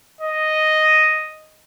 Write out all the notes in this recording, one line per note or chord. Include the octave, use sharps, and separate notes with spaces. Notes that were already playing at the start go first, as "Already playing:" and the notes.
D#5